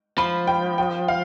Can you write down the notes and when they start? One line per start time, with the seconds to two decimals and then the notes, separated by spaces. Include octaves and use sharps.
0.18 F3 B5
0.47 G5
0.78 G5
1.08 F5